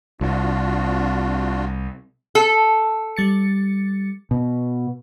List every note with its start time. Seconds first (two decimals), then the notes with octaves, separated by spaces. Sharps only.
0.21 C2 D4 F4 F#4
2.35 A4
3.16 G3 A6 C#7
4.31 B2